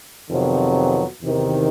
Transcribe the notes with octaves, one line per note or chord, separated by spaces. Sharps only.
F2 C3 D#3 F#3 B3
E2 C3 D#3